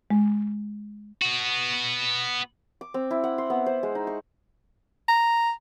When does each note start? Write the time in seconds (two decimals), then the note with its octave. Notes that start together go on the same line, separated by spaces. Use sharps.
0.10 G#3
1.22 B3 F#4
2.81 D6
2.94 C4
3.11 E4
3.24 F#5
3.38 C6
3.50 B3
3.66 C5
3.83 G#3
3.95 D#4
4.07 C#6
5.08 A#5